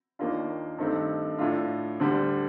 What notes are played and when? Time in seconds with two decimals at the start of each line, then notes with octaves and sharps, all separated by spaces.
0.19 D#2 D#3 A#3 D4 F4
0.78 G2 D#3 A3 C4 D#4
1.38 A2 A3 D4 F4
2.00 D2 D3 G3